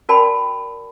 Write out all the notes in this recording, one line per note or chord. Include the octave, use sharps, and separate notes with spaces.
F#4 A#4 D5 G5 A5 B5